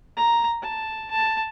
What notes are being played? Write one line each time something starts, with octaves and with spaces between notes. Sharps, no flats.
A#5
A5
A5